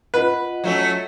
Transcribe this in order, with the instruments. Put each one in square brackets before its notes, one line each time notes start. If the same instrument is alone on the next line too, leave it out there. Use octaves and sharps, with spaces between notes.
[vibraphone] F4 D#5 F#5 [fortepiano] B4
[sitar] F#3 A3 C#4